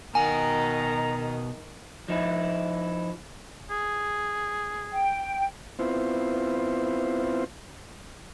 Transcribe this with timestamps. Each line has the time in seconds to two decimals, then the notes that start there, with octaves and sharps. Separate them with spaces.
0.15 B2 D#3 D#5 F#5 G#5 A#5
2.08 F3 D#4 E4
3.71 G#4
4.93 G5
5.79 B3 C4 E4 F4 C5